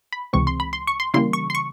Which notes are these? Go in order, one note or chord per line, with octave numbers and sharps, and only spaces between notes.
B5
C#2 C3 E3 G#3 C4 C#6
C6
B5
C6
C#6
C6
C#3 E3 G3 A#3 C6
C#6
C6
C#6